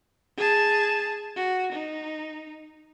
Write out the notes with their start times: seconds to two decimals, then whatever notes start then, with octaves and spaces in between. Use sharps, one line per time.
0.38 G#4 A5
1.36 F#4
1.72 D#4